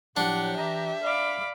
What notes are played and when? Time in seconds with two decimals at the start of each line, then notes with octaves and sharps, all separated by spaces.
0.17 A2 F3 F#3 D4 G4 F#5
0.57 E3 E5 A#5
1.03 D5 F5 B5 D6